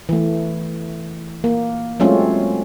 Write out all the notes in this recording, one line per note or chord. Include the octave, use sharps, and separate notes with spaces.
E3 A3
A#3
F#3 G#3 A3 C4 C#4 F4